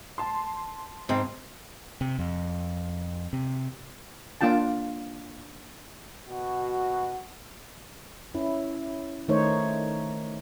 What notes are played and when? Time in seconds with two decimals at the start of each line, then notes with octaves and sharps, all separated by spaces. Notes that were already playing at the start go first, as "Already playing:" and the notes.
0.18 A5 C6
1.09 G#2 C4
2.01 C3
2.18 F2
3.33 C3
4.41 A#3 D4 F4 G5 A5
6.30 B2 F#4
8.34 C#4 E4
9.28 D#3 A3 D#4 C5 C#5